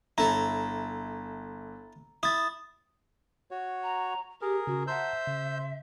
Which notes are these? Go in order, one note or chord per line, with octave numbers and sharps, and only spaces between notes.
G1 E4 A4 A#5
E4 D#6 A6
F#4 C#5
A#5
G4 G#4 A#4
C#3 F#4
C5 E5 F#5 A5 A#5 E6 G6
C#3